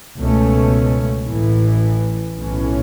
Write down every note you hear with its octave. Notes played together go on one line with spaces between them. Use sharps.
C#2 B2 A3 C#4
A1 A2 E3
B1 A2 E3 C#4